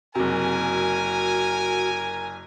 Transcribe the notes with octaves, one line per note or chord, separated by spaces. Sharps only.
F#1 C3 F#4 A#4 G#5